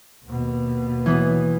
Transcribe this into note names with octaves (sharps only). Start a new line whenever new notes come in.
D#2 B2
E3 B3